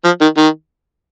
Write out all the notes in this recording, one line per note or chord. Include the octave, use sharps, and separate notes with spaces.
F3
D#3
D#3